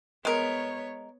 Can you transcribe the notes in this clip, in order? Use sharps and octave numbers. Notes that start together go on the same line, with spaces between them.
G#3 B3 A#4 C#5